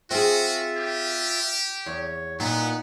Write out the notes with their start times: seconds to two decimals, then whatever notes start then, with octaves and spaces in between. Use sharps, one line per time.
0.11 C4 F4 F#4 G#4 E5
0.77 G4
1.86 E2 C#5
2.40 A#2 B3 D#4 F#5